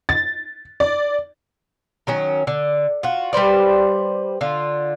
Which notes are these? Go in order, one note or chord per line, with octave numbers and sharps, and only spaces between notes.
A6
D5
D#3 F#3 C#4
D3
F4 F#4
G3 B4 C5 D5
D3 F4